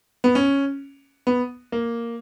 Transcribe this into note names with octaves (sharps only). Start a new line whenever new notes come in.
B3
C#4
B3
A#3